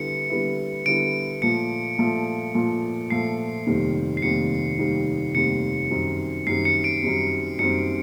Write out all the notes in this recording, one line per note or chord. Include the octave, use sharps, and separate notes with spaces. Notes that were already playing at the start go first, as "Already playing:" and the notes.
Already playing: D3 G3 B3 E4 C#7
D3 G3 B3 E4
D3 G3 B3 E4 D7
A#2 F3 A3 C#7
A#2 F3 A3
A#2 F3 A3
A#2 F3 A3 C7
F1 D#2 D#3 G3 C4
C7
F1 D#2 D#3 G3 C4 C#7
F1 D#2 D#3 G3 C4
F1 D#2 D#3 G3 C4 C#7
F#2 D#3 G3 C4
F#2 D#3 G3 C4 C7
C#7
D7
F#2 D#3 G3 C4
F#2 D#3 G3 C4 C#7